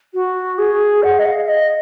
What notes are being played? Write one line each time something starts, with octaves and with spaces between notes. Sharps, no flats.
F#4
G#4
F#5
D#5
F5
D#5